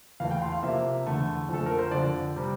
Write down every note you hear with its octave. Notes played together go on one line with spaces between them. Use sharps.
E2 E3 A3 F5
G5
C6
F5
C3 F3 A#3 E5
E2 D3 A3
F2 D3 F3 A3 A4
A#4
C5
F2 D3 F3 D5
C3 G3